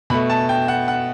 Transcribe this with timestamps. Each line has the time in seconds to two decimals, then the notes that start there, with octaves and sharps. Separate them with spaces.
0.10 B2 B5
0.13 A3
0.30 A5
0.49 G5
0.68 F#5
0.88 F#5